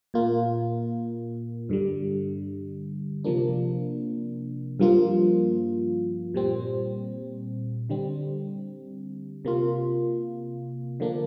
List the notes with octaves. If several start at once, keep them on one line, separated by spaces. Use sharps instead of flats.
A#2 A#3 F4
G2 D3 G3
C3 F3 A#3 D4
G2 F3 A#3 F4
A#2 G3 C4
D3 G3 C4
C3 A#3 F4
D3 F3 A#3 D4